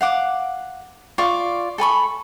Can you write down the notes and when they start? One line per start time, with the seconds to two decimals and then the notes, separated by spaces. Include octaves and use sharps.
0.01 F5 F#5 D6
1.18 F4 D5 C#6
1.78 A4 G#5 B5 C#6